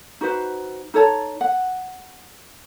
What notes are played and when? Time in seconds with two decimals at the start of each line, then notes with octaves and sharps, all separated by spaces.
0.21 D#4 F#4 B4 C5
0.94 D#4 A4 C#5 A5
1.41 F#5